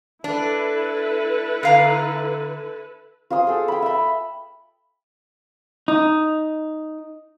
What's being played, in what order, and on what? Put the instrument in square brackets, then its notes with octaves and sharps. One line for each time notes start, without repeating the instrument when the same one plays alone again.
[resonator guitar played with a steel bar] D4 [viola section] E4 A4 B4
[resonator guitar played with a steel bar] D3 F5 A#5
[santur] F4 C5 G#5 D#6
G#4 A4 G5
G5 B5
E5 B5
[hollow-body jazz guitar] D#4